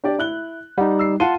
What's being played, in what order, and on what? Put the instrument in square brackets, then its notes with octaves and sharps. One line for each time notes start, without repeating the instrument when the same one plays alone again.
[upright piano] D4 G4 D5
E4 F#6 G7
[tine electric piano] G3 D#4 [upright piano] F#5
[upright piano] E6 C7
[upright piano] F4 D#7 [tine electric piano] F#5 A5 C6